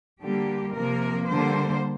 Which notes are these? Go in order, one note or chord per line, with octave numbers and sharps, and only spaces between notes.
D3 G3 A#3 G4
C3 F3 A#3 A#4
D3 G3 A#3 C5